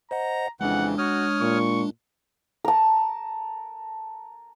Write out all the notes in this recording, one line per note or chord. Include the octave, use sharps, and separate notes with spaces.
C5 D#5 F#5 A#5
F2 C#3 E3 G#3 D4 F#5
F#4 C#5 D#6 F6
A#2 C#6
A#4 A5